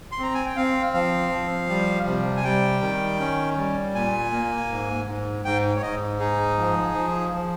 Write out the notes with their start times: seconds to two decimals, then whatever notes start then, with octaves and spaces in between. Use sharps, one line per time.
0.12 C6
0.19 C4 A#5
0.34 G#5
0.46 G5
0.56 C4 F5
0.94 F3 F5
1.32 F3
1.69 G3
2.07 C3
2.37 G#5
2.44 G3 G5
2.82 D#3
3.20 C#4
3.57 G3
3.94 A#2 G#5
4.32 A#3
4.70 G#2
5.07 G#2
5.45 G#2 G5
5.76 C#5
5.82 G#2 D#5
6.20 D#4 G#4
6.58 F3
6.94 F3
7.33 F3